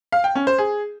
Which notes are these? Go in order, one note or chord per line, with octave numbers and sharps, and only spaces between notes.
F5
G5
C#4
C5
G#4